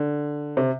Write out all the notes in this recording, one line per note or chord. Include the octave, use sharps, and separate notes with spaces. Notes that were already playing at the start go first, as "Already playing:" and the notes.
Already playing: D3
C3